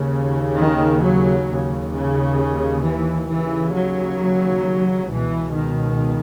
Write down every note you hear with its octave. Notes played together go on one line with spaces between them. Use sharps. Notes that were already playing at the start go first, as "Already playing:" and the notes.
Already playing: D#2 C#3
D#3
F#3
D#2 C#3
C#3
E3
D#2 C#3 E3
F#3
C#2 B2 E3
D#3